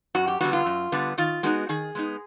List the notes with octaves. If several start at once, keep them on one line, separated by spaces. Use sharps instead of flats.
F#2 F#4
G4
D3 G3 B3 F#4
F4
F#2
D3 G3 B3
D#3 F4
G#3 B3 D#4 F#4
D#3 G#4
G#3 B3 D#4